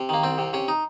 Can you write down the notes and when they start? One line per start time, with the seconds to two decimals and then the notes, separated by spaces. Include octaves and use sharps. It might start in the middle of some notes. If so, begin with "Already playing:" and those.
Already playing: C3
0.09 D#3 A#3
0.24 C2 C4
0.38 C3
0.53 C3 C#4
0.68 D#4